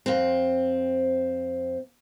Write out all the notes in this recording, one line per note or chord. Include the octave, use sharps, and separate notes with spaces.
F2 C4